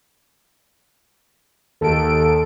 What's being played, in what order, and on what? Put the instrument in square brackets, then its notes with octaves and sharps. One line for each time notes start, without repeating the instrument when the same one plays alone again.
[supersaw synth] D#2 D7 [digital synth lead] A4